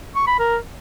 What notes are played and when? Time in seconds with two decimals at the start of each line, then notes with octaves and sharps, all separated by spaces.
0.15 C#6
0.27 B5
0.39 A#4